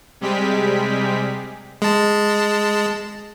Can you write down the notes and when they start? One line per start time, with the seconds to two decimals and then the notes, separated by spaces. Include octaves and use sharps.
0.21 C3 G3 G#3 G4 G#4 B6
1.82 G#3 A5